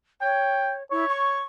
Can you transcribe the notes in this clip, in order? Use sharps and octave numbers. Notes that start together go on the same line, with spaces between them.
C#5 G5
E4 C#5
C#6